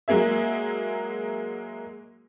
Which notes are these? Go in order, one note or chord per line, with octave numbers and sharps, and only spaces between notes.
F#3 G#3 A#3 G#4 E5